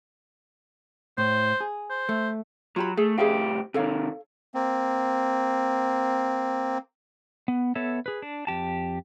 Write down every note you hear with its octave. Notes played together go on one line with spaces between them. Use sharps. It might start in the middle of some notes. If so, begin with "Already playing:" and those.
A2 C5
G#4
C5
A3
F#3 F4 G4 B5
A3 G#4
C2 A2 G4 G#4 E5 F5
C3 D#3 A4 C#5 F5
A#3 C4
B3
B3 A4 C#5 E5
G#4 B4
D4
F2 G4 A5